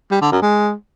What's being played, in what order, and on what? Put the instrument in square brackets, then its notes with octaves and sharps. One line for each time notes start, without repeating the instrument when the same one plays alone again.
[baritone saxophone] G3
D3
F#2
G#3